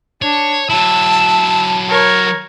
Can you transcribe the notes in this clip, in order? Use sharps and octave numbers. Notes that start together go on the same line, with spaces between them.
D4 C#5
F#3 E4 A5 E6
A#4 C#5